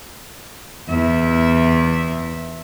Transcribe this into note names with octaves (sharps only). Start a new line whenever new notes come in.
E2 E5